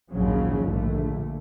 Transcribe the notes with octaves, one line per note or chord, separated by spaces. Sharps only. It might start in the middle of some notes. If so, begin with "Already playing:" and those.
A#1 D#2 G#2 C#3 F3 F#3
A#1 D3 A3